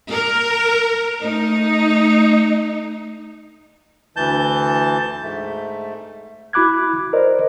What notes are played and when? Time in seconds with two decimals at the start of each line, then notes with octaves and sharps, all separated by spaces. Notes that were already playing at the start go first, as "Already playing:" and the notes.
0.10 A#4
1.22 A3 D#4
4.16 D2 E3 A5 G6
5.22 G#2 A3
6.53 E4 F#4 B5 D6 F#6 G#6
7.13 A#4 C5 D5 D#5